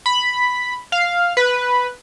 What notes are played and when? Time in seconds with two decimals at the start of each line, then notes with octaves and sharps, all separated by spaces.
0.06 B5
0.92 F5
1.37 B4